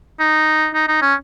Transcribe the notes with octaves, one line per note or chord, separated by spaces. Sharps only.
D#4
D#4
D#4
C#4